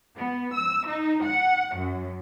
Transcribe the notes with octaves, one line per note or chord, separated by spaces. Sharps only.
B3
E6
D#4
F#5
F#2